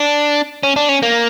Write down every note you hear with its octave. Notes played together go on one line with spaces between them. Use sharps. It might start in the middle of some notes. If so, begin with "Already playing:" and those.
Already playing: D4
C#4
D4
C#4
A#3